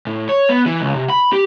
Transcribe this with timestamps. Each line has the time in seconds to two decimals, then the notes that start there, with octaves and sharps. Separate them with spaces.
0.07 A2
0.29 C#5
0.49 B3
0.66 E3
0.81 C#2
0.96 C3
1.10 B5
1.33 G4